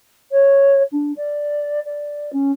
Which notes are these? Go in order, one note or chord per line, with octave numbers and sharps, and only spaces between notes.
C#5
D4
D5
D5
C#4